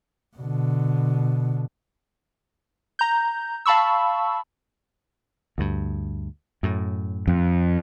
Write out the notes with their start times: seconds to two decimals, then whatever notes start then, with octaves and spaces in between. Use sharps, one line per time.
0.36 B2 D3
2.99 A#5 G6
3.66 F5 A5 B5 C#6 E6
5.58 D2 G2
6.63 F#2 A2
7.27 F2